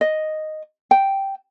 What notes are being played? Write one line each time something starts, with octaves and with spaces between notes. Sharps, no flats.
D#5
G5